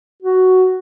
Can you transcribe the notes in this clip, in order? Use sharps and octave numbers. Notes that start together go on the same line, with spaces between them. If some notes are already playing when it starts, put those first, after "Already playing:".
F#4